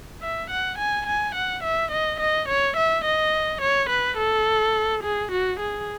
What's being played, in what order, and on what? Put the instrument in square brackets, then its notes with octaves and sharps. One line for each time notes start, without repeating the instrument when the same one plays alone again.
[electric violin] E5
F#5
G#5
G#5
F#5
E5
D#5
D#5
C#5
E5
D#5
C#5
B4
A4
G#4
F#4
G#4